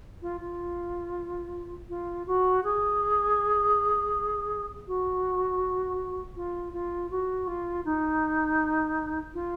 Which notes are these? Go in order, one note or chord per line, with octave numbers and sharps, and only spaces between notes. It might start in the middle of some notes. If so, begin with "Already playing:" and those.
F4
F4
F4
F#4
G#4
F#4
F4
F4
F#4
F4
D#4
F4